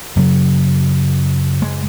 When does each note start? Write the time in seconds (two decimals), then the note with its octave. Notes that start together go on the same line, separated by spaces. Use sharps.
0.16 F#2 C#3 F#3
1.62 G#3